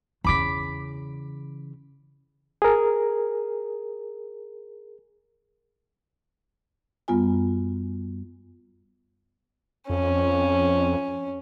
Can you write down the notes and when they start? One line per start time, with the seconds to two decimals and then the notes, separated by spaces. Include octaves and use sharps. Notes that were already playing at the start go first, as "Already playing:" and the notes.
0.24 E2 C#3 B5 D6 B6
2.62 G#4 A#4
7.08 F#2 G3 B3 F4 G#5
9.90 F2 C#4